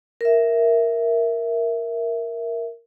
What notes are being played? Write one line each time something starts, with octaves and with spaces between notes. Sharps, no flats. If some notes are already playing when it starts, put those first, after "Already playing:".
A#4 E5